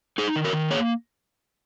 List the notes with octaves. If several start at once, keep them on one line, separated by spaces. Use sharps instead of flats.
D#4 G#4
D#3
F#4 A#4
D#3
A#3 G#4 C#5